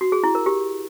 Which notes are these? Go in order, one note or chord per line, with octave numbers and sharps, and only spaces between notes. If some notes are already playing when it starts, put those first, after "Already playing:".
F#4
G#4
E4
A#4
G4